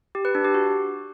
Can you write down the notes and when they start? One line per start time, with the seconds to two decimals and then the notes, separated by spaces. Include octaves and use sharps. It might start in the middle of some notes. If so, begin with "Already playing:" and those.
0.15 G4
0.25 B4
0.35 D4
0.45 G4
0.54 F#4